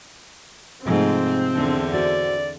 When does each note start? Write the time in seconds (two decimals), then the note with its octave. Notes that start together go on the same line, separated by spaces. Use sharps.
0.85 G#2 C3 F3 A3 C4 A4
1.54 E2 D3 D4
1.93 D4 F#4 C5 D5